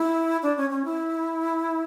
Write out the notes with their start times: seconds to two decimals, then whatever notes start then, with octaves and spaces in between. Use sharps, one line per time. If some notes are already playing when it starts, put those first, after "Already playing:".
Already playing: E4
0.43 D4
0.57 C#4
0.70 C#4
0.85 E4